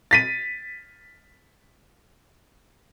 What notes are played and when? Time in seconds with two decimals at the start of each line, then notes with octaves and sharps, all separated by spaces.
0.11 A6 B6 D#7